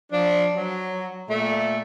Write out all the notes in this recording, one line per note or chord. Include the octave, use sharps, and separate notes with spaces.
F3 D4
F#3
A#2 A3